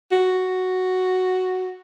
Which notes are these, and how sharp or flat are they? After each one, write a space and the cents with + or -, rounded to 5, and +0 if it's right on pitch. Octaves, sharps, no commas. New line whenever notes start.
F#4 +0